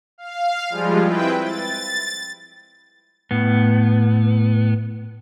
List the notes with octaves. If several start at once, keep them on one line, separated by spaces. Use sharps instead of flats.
F5
F3 G3 G#3 F4
C4 E4 B4 G5
A6
A2 B3